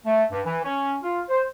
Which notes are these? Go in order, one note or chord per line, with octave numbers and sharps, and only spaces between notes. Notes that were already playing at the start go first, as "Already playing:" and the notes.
A3
G2
E3
C#4
F4
C5